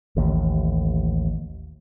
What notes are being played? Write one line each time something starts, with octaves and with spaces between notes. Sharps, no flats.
A1 D#2 A2